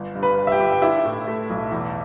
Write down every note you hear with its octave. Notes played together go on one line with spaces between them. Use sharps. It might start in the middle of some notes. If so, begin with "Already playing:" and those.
Already playing: G1
G2
B4 B5
G3
E5
G4 G5
G1
G5
D4 E4 E5
A2
A3
B1
E2